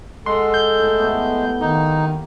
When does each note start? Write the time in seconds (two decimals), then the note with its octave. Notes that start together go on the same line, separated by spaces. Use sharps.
0.26 G#3 A4 F#5 C6
0.54 G6
0.79 A2 E4
0.98 G3 A3 B3
1.61 D#3 A#3 D#4